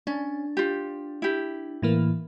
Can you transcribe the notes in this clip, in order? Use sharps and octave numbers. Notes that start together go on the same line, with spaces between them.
C#4 D4
F4 G4
E4 G4
A2 E3 A#3